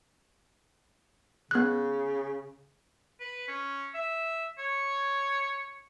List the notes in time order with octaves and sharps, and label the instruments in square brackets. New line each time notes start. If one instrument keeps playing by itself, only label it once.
[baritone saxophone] C#3 [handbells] B3 F#6
[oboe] B4
C#4
E5
C#5